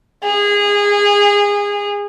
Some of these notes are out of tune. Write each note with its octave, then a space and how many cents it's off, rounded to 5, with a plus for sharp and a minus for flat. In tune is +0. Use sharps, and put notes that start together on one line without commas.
G#4 -25